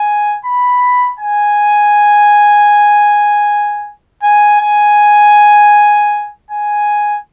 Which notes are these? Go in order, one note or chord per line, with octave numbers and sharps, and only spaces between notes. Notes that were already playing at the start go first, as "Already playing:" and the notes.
Already playing: G#5
B5
G#5
G#5
G#5
G#5